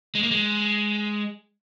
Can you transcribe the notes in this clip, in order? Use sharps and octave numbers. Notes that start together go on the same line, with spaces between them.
G#3
A#3
G#3